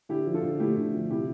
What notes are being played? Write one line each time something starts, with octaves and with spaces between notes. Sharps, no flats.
D3 E4 G4
F3
F4 A4
D3
A3 E4 G4
D3
F3
C3 E4 G4